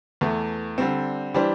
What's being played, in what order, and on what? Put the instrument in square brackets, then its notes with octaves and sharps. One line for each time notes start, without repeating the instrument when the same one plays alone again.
[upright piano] E2 E3 A3
D3 G3 C4
E3 G3 D4 G4 C5